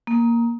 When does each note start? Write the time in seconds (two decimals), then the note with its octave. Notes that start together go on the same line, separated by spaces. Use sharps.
0.07 A#3